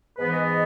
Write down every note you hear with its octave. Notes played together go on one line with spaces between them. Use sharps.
G#2 E3 B3 B4
D#5
D#5